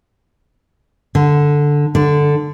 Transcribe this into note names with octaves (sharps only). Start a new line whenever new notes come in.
D3
D3